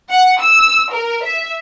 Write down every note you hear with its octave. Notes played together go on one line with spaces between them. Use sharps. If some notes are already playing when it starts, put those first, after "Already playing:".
F#5
E6
A#4
E5